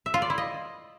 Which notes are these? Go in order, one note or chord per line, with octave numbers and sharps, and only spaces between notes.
E5
F4
D5
E4
D#5